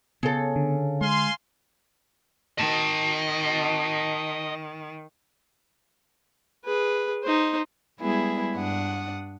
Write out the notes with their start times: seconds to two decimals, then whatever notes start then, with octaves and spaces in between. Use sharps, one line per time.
0.23 C#3 B3 A4
0.56 D3
1.01 G#3 F5 G#5 C6
2.58 D#3 D#5 A5
6.64 G#4 B4
7.23 D#4 C5
8.00 G3 G#3 B3 E4 G#4
8.56 G2 D4 F#5 D#6